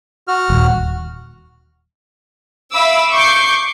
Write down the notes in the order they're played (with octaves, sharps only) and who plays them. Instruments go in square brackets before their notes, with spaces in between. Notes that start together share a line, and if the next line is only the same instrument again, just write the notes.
[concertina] F#4 F6
[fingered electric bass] D#1
[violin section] E5 F5 B5 D6 E6
C#6 D6 G6 C7